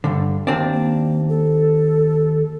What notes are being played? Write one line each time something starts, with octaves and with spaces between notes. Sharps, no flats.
G2 D3
D#2 C4 D4
A#3
A4